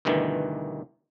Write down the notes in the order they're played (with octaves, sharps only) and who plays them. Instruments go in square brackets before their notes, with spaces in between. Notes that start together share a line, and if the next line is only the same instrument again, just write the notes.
[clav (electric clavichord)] D2 G2 B2 D#3 E3